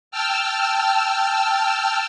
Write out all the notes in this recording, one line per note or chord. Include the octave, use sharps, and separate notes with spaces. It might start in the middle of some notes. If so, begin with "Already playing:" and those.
G5 A5 E6 F6